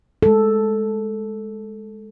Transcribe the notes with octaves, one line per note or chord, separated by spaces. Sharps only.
G#3 A4